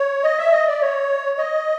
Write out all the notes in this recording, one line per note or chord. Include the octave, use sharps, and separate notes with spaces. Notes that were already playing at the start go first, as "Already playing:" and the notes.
Already playing: C#5
D#5
E5
D#5
D5
C#5
D#5